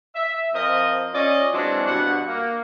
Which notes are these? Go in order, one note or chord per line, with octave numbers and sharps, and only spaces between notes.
E5
F3 C4 A#4 D#5
C#4 F4 D5 D#5
E3 F#3 G#3 C4 D4 F#4
G2 B2 F#5
A#3